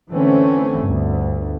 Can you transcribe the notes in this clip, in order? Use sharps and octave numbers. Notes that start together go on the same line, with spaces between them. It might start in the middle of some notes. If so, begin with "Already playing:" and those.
D3 E3 A3 C4 C#4
G1 D2